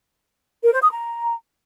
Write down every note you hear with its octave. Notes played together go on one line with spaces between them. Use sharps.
A#4
C5
D#6
A#5